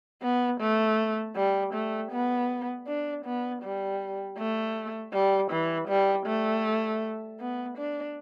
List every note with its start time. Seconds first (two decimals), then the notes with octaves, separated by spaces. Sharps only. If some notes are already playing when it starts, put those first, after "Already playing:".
0.23 B3
0.60 A3
1.36 G3
1.74 A3
2.12 B3
2.87 D4
3.25 B3
3.63 G3
4.38 A3
5.13 G3
5.51 E3
5.88 G3
6.26 A3
7.40 B3
7.78 D4